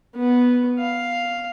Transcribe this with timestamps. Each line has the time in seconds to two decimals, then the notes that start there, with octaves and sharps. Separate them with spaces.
0.15 B3
0.79 F5